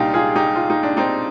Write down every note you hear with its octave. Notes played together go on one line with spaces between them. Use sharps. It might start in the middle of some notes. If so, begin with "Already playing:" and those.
Already playing: C2 A#2 D4 D#4 F4 G4
F4 G#4
D#4 G4
F4
D#4
D4
C4 D#4